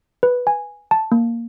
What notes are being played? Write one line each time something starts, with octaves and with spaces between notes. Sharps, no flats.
B4
G#5
A5
A#3